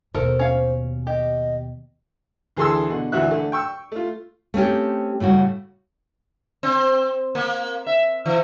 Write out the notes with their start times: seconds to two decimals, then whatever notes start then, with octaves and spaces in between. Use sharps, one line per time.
0.15 D#2 B2 A4 A#4 C5
0.39 C#4 F5
1.07 G4 D#5
2.57 D2 E3 G#4 A4 C6 E6
2.89 B2 D3
3.12 D2 A#2 E3 F#4 E5 F#6
3.31 D3 A3
3.52 G5 C#6 E6
3.92 A3 F4
4.54 A3 C4 C#4 G4
5.20 A2 C#3 G3 F#4
6.63 C4
7.35 A#3
7.86 E5
8.26 E3